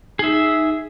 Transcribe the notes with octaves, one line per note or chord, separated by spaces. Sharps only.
D#4 G#4 E5